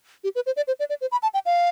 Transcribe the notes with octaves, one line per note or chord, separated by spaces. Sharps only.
G4
B4
C5
D5
C5
D5
D5
C5
B5
A5
G5
F5